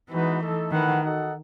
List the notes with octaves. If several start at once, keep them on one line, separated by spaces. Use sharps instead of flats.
E3 G#3 B3 D#4 F#4 B4
A3 D#4 A4
D#3 A3 E4 B4 F#5
D#4 F#4 A4 D#5 F#5